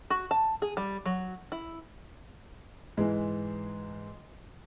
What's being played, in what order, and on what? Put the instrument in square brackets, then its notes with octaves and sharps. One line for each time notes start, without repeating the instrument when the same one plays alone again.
[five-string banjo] F#4
A5
G#4
G3
F#3
E4
[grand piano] G#2 E3 G#3